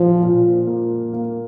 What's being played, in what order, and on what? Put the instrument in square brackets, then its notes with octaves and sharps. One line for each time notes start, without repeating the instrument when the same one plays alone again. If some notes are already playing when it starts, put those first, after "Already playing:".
Already playing: [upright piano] A#2 [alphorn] F3
[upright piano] A#2
A#3
A#3